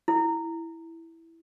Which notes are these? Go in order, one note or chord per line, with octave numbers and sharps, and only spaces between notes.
E4